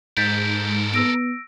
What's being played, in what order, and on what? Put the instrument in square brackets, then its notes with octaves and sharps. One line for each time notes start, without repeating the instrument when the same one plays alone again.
[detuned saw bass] G#2 [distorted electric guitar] A4 A#4 [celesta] G6 A6 B6
[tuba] B3 [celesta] E6 A#6 D7